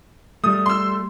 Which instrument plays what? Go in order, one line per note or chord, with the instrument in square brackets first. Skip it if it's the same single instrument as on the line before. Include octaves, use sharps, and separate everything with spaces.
[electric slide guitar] G3 A3 [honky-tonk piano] D#6
[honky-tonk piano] C6 E6